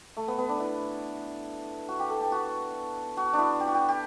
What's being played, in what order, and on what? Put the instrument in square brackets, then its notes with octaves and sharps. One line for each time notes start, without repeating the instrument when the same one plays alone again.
[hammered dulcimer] A3
B3
B3
D4
E4
F#4
G4
A4
G4
F#4
F#4
D4
E4
G4
F#4
G4
G4